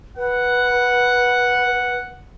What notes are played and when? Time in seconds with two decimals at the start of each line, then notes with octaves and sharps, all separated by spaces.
0.17 B4 F#5